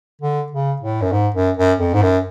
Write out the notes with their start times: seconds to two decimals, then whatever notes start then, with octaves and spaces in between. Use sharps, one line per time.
0.22 D3
0.52 C#3
0.82 A2
1.02 F#2
1.12 G#2
1.35 F#2
1.57 F#2
1.79 F2
1.94 G#2
2.02 F#2